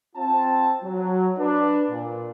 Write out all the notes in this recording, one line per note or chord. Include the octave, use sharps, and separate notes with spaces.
C4 F4 A5
F#3
D4 B4
A#2